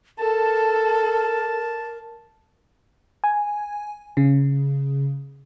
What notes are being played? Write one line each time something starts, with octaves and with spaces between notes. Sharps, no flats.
A4 A#4 A5
G#5
C#3